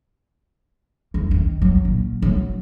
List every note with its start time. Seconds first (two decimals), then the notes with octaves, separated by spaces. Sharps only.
1.14 E2
1.31 D#3
1.62 F#3
1.85 A#2
2.22 F#3